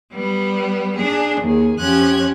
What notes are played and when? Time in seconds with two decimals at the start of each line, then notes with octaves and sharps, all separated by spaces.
0.13 G3 B3
0.96 D4 G#4
1.40 D#2 G#4
1.77 F2 F3 C#4 G4 F#6 G#6